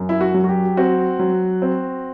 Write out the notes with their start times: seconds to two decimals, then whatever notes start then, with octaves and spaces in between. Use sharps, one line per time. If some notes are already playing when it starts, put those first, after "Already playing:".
Already playing: F#2
0.09 E4
0.21 F#4
0.34 F#3
0.44 F#4
0.49 G4
0.77 C4 F#4
1.19 F#3
1.62 C4